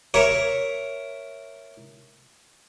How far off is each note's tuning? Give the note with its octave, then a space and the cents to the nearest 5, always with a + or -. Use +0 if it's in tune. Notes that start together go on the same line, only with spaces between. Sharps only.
A#4 +0 C#5 +0 E5 +0